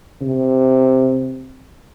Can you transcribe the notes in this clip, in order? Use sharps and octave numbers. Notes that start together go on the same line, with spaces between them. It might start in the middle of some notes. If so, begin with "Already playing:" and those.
C3